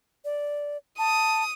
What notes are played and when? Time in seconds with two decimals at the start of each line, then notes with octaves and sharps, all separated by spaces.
0.25 D5
0.99 A5 D#6